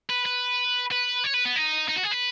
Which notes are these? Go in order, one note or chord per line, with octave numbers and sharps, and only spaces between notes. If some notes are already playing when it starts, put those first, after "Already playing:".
B4
B4
B4
C#5
B4
B3
D#4
D#4
F#4
G#4
B4